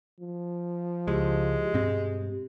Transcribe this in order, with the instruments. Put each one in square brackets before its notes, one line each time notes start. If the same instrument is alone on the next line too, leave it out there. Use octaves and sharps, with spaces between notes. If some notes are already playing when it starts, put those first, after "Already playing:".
[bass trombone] F3
[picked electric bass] C#2 [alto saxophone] G#3 [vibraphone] E4 G4
[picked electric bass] G2 B2 C4 [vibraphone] G4